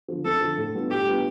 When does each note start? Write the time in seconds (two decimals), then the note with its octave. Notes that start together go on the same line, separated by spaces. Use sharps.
0.08 D3 F3
0.25 F2 A4
0.41 D3 F3
0.57 A2
0.75 G3 B3 D4 F4
0.91 A2 G4
1.07 G3 B3 D4 F4